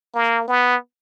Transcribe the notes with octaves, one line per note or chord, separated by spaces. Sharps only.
A#3
B3